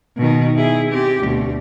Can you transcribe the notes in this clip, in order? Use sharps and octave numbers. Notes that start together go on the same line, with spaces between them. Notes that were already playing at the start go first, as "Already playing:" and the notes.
B2 D#3
E4 G#4
C4 G4
D2 B2